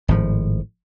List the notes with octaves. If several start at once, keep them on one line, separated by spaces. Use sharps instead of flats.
G#1 A2 F3